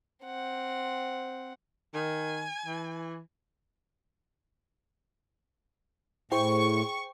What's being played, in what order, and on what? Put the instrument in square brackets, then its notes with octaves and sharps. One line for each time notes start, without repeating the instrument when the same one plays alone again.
[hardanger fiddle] C4 F#5
[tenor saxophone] D#3 [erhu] G#5
[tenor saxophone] E3
[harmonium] A2 [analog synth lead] E4 [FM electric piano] G#4 C5 G5 [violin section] C#6